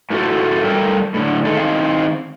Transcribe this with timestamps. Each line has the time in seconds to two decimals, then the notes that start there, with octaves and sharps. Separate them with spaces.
0.10 A2 A3 F4 F#4 G#4 A4
0.64 G3 A4 A#4 G5 A5
1.14 A2 D3
1.45 D#3 G#3 A4
1.57 D#3 C4 F5